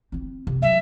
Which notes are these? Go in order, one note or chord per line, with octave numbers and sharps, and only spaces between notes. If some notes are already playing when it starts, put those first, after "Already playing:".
C4 E4
C3
F#3 G3 E5